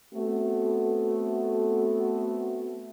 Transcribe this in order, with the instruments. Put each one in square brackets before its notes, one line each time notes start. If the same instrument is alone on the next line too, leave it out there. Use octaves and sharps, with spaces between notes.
[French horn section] A3 B3 C4 F#4 A4